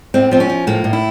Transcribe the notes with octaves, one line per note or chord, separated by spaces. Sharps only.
A2 C4
F3 C4
C#4
F3
A2 A#3
A2
E4